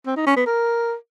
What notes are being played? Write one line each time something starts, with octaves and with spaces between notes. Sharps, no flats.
C4
D#4
C#4
B3
A#4